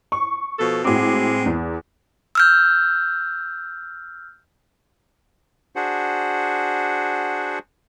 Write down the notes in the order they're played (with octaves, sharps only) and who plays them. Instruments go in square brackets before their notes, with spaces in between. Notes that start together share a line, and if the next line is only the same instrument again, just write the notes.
[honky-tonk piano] C#6
[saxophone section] B2 F3 A4
[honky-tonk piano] A2 F#4 D6 [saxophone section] G#3 C4
[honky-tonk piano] E2
[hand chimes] E6 F6 G6
[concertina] D4 F#4 G#4 C5 F#5